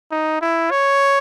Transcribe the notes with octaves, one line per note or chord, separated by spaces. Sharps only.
D#4
E4
C#5